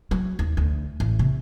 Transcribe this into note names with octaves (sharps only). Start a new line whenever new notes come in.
F#3
D#2
D2
A1
C3